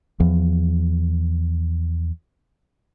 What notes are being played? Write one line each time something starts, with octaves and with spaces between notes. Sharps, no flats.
E2 F3